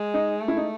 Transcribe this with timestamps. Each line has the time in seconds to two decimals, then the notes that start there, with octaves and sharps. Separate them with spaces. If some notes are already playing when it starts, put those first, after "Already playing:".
Already playing: G#3
0.14 D#4
0.41 A3
0.48 E4
0.57 D#4